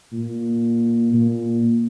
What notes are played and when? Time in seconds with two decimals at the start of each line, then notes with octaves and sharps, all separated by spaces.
0.12 A#2
1.13 A#2